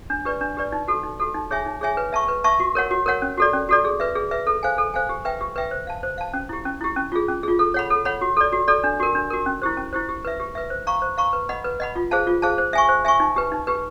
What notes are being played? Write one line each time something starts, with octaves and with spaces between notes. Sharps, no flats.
D4
G4 B4 D5
D4
G4 B4 D5
D#4
F#4 A4
D#4
F#4 A4
D#4
G#4 C#5 E5 G#5
D#4
G#4 C#5 E5 G#5
B4
E5 A5 C#6
B4
E5 A5 C#6
F#4
A#4 C#5 F#5
F#4
A#4 C#5 F#5
C#4
F#4 A4 D5
C#4
F#4 A4 D5
G#4
B4 E5
G#4
B4 E5
A4
C5 F5 G#5
A4
C5 F5 G#5
G4
B4 E5 G5
G4
B4 E5 G5
C5
F5 A5
C5
F5 A5
C#4
E4 G4
C#4
E4 G4
C#4
F4 G#4
C#4
F4 G#4
A4
C#5 F#5 B5
A4
C#5 F#5 B5
F#4
A4 D5
F#4
A4 D5
D4
F#4 A#4
D4
F#4 A#4
C#4
E4 G4 C5
C#4
E4 G4 C5
G4
B4 E5
G4
B4 E5
C5
F5 A#5 C#6
C5
F5 A#5 C#6
B4
D#5 F#5 B5
B4
D#5 F#5 B5
F4
G#4 C5 F5 A5
F4
G#4 C5 F5 A5
C5
E5 G#5 C#6
C5
E5 G#5 C#6
D#4
G4 B4
D#4
G4 B4